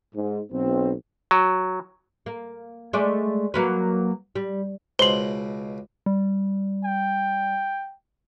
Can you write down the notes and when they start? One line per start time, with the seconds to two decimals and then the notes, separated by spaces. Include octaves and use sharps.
0.15 G#2
0.51 B1 C4
1.31 F#3
2.26 A#3
2.93 G#3 A3 D5
3.54 F#3 A#3 B4
4.36 G3
4.99 C#2 B2 C5 C6 F#7 G7
6.06 G3
6.84 G5